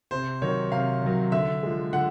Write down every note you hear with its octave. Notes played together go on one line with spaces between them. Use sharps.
C3 C5
D#3 F#3 C#5
C3 F5
D#3 F#3
D3 E5
F3 G#3
D3 F#5